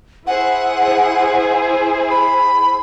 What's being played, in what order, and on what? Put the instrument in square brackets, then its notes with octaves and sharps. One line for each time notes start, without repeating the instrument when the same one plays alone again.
[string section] E4 G#4 C5 [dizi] F#5
[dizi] B5